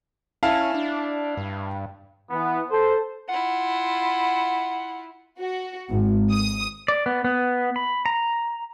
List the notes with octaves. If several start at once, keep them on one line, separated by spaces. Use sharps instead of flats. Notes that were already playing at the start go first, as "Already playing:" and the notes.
C#4 E4 F5 A5
D4
G2
E3 B3
A4 C5
E4 F4 F#5
F#4
G#1
D#6
D5
B3
B3
B5
A#5